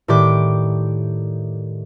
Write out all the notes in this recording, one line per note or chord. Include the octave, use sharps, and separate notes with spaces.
A2 D#3 G4 D5 D6